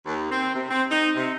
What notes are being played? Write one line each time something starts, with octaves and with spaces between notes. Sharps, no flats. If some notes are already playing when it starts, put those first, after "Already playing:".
D#2
C4
C3
C4
D#4
C3